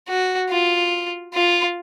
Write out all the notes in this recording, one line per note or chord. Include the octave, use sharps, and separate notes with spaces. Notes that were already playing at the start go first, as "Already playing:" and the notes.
F#4
F4
F4